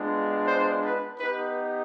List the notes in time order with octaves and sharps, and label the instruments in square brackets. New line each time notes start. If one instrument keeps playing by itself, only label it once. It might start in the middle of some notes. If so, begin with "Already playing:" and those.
Already playing: [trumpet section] G#3 B3 D4 F4
C5
B4
B3 D#4 G4 B4